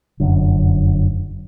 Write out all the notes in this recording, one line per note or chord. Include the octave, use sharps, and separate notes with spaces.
F1 F#2 D3